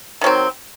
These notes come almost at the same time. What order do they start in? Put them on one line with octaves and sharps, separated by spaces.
D#3 F#3 C4